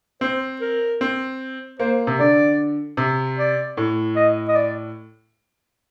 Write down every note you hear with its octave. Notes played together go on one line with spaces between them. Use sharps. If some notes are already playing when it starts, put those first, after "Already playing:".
C4 C5
A#4
C4
A#3 C5
C3
D3 D5
C3
D5
A2
D#5
D#5
D5